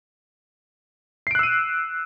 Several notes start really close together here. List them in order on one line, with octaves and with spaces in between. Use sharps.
C7 D7 F#6 E6 D#7